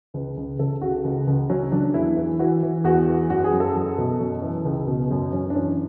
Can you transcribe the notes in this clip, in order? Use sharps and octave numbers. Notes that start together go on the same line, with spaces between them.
C#2 B4
C#2
C#2 A4
C#3 F#4
C#2
C#2
F#3 C#4
F#3 D4
E2 E4
E3
E3 F#4
E3
E2 F#4
E3
F#2 F#4
G#4
F#2
A4
F#3
B2
F#2
E3
C#2
B2
F#2
F#2 C#4
D4
E3 C#4